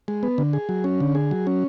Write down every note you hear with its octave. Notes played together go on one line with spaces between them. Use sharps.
G#3
B3
D3
G#4
F#3
C#4
D3
G#4
F#3
C#4